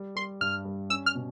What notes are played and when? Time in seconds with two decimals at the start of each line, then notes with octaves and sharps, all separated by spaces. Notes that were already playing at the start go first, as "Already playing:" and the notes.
Already playing: G3
0.16 G3 C6
0.41 G2 F6
0.65 G3
0.90 C#4 E6
1.06 F6
1.15 B2